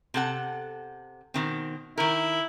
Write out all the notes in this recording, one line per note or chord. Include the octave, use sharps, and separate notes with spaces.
C3 A4 F#5
B2 D#3 C4
D#3 E4 A#4